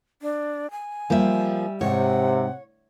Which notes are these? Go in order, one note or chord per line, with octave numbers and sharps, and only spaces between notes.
D4
G#5
F3 G3 A#3 E5
G#2 C3 C#5 F#5